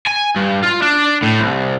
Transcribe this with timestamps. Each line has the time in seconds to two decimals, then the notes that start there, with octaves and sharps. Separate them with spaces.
0.07 G#5
0.36 G2
0.63 F4
0.82 D4
1.23 A2
1.39 C2